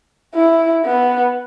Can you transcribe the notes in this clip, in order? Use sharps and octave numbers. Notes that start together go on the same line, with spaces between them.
E4
B3